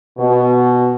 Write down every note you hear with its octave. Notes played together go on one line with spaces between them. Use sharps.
B2